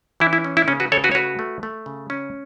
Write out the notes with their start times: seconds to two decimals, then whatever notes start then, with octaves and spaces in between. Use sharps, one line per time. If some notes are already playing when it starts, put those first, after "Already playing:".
0.20 E3 E4
0.33 E4
0.44 C#4
0.57 E4
0.68 C#3 C#4
0.80 F#4 B4
0.92 C#3 A4 C#5
1.04 F#4 B4
1.12 C#5
1.15 A3 F#4 B4
1.39 A3
1.63 A3
1.86 C#3
2.10 C#4